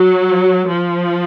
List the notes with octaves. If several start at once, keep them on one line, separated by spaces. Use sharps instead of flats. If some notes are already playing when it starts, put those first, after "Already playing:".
Already playing: F#3
F3